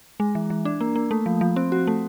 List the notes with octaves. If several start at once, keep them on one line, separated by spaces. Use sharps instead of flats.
G#3
E3
E3
D4
A#3
A#3
A3
F3
F3
C4
F#4
A3